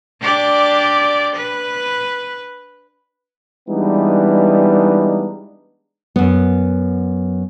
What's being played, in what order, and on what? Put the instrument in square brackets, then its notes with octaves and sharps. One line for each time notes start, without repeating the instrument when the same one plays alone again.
[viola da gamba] D4 G4 D5
B4
[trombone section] E3 G3 G#3 B3 D4 D#4
[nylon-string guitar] F#2 B3